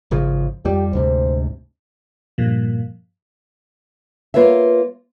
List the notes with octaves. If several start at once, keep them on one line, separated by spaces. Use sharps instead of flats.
G#1 C#3 F3
F2 G3 G4
D2 G#2 C3 C5
G2 A#2 F3
A#3 F4 B4 C#5 E5